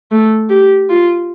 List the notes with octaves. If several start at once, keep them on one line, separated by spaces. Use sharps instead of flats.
A3
G4
F4